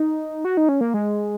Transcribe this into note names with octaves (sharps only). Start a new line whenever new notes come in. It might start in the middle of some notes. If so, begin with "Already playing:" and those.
Already playing: D#4
F#4
D#4
C#4
A#3
G#3